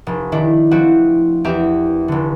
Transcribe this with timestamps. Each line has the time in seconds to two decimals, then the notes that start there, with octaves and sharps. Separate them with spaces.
0.07 F1
0.32 D#3 A3 D4 E4
0.71 F3 C4 E4 F#4
1.44 E2 C4 G4 A#4 E5
2.08 F1 D3